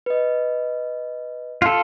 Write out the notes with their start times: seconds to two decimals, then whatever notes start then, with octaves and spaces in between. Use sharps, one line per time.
0.06 B4 D#5
1.62 F4 A4